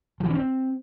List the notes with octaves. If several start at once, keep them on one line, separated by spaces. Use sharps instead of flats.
F3
E3
C#4
C4